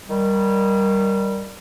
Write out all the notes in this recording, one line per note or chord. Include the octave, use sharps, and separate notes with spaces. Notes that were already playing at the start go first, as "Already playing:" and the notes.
D#3 G3